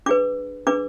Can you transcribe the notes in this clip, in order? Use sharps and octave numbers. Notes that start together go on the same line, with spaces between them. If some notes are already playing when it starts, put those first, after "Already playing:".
D4 G#4 B4 D6
D4 G#4 B4 D6